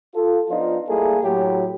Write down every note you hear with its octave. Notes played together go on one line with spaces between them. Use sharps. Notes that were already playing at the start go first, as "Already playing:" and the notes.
F4 A4
F3 B3 D4 D#4 F4
G3 A3 A#3 E4 G#4 A4
A2 F#3 G4